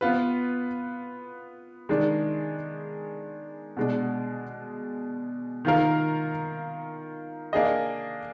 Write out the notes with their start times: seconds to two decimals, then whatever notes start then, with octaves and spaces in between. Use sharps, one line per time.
0.01 B3 F4 B4
1.89 D#3 G#3 D4
3.77 B2 G#3 D4
5.65 D#3 A#3 F4 A#4 F5
7.53 A#3 D4 G#4 D#5